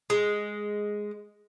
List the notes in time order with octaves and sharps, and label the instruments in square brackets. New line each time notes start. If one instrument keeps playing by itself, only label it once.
[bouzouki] G#3